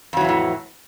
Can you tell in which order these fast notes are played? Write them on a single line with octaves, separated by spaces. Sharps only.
F2 F#3 E3 C#3 A2